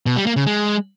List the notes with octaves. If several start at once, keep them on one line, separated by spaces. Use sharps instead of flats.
B2
G3
A#3
C#3
G#3